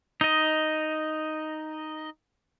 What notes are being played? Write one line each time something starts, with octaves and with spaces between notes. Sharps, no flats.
D#4 D#5